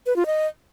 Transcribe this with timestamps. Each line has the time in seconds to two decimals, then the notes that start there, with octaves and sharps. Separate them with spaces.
0.06 B4
0.16 F4
0.26 D#5